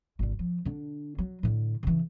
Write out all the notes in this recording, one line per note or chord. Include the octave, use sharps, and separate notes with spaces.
G#1 D3
F3
D3 D4
F#3
A2 D3
C#3 E3